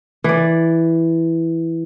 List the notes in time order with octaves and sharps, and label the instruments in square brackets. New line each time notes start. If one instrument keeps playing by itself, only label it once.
[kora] E3 D5